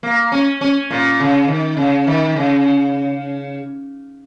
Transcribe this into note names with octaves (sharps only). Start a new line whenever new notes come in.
A#3
C#4
C#4
A#2
C#3
D#3
C#3
D#3
C#3